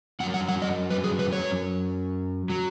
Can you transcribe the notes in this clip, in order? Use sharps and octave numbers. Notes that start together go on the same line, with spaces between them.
F#2 F#3 F#5
F#5
F#5
D#5
B4
G#4
B4
C#5
F#3